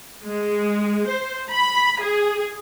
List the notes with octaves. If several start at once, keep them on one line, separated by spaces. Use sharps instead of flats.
G#3
C5
B5
G#4